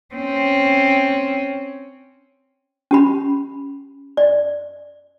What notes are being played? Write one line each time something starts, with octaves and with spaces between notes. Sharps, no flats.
C4 C#4
C#4 G4 B5
D5